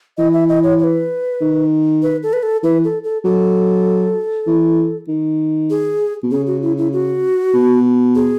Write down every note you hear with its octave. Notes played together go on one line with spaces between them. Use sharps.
E3 D#5
E5
D#5
C#5
C#5
B4
D#3
B4
A4
B4
A4
E3 B4
A4
A4
F#3 A4
E3
D#3
G#4
B2
C#3 G#4
F#4
E4
E4
F#4
B2
G#4